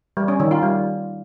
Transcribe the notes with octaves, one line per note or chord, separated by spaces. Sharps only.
G3
C#4
D#3
F4
G3